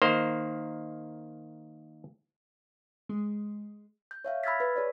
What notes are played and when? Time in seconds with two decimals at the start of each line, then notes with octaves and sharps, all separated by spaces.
0.02 D#3 A#3 C5
3.09 G#3
4.11 G6
4.25 C#5 E5 F5
4.44 B5 E6 F6 G#6 A6 B6
4.60 B4 B6
4.76 G#4 C#5 D5